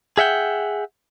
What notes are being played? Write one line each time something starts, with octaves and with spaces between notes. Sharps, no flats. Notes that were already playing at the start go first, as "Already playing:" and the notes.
G#4 E5 F#5 G5